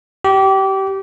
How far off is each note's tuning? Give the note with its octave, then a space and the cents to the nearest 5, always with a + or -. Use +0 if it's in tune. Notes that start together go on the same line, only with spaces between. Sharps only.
G4 -25